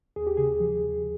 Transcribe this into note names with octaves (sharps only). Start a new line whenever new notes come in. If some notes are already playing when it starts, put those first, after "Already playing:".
D#2 G#4
G4
C#3 G#4
F3
D#2